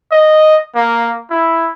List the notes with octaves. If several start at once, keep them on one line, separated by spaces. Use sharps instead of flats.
D#5
A#3
E4